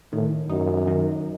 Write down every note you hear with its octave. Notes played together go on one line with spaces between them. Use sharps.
A2 D#3
F#2 D#4
D#3